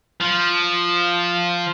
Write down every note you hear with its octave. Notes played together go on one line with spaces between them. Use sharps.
F3